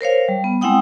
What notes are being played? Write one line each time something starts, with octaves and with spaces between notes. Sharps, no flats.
A#4 C5 C#5 F5
G3
B3
G#3 C4 E4 F#5 G5 D#6